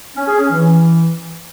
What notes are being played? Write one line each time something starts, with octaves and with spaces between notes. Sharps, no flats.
C#4
G#4
C#4
E3